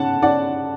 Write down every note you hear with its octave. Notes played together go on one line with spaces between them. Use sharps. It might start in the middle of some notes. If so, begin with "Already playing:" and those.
Already playing: C#4 F#5 A5
C#4 D5 F#5